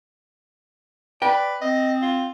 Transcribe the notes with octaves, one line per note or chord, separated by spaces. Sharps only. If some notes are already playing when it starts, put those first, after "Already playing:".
B4 D5 G5
C4 D#5
F4